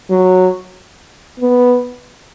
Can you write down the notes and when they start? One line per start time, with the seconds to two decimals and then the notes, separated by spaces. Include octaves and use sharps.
0.11 F#3
1.40 B3